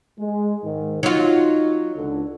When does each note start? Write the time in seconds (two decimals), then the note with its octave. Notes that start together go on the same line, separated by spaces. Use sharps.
0.19 G#3
0.64 G#2 D#3
1.03 F#3 D#4 F4
1.96 C#2 D3